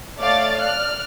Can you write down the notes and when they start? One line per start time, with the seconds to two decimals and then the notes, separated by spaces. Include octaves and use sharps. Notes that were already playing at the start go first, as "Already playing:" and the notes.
0.18 A3 C#5 D5 F5 D6 A6
0.58 D5 F6 F#6